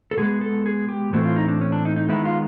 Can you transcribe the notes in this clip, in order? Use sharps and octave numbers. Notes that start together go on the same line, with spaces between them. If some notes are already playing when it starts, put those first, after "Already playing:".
A4
B2 G#3 B3 G#4
A4
G#4
G4
A2 E3 A3 C4 F#4
F4
D#4
D4
C#4
D4
D#4
D#4
D#3 G#3 B3 E4
F4